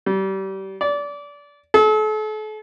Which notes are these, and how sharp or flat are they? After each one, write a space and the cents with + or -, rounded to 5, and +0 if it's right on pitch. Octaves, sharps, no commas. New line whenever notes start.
G3 -30
D5 -25
A4 -40